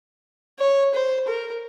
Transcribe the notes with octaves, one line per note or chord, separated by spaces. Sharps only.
C#5
C5
A#4